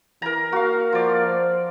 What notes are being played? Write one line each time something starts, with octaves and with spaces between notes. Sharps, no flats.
E3 A#4 A#5
A#3 F#4 F5
F3 D5
C5